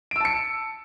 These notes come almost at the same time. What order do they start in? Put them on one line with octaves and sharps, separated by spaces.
D7 E6 A5 C#7